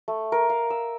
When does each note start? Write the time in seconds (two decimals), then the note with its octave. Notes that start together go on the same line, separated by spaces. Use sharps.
0.08 A3
0.32 A#4
0.50 F5
0.70 E6